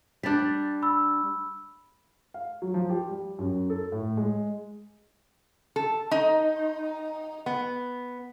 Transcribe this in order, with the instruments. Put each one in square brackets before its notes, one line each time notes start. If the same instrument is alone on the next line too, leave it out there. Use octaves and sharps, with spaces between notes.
[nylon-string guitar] G3 D4 [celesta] F#6 A6 B6
[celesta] B5 E6
[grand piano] F5
F#3
F3
G4
G3
F#2
A4
A2
G#3
[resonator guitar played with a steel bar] A4
D#4
B3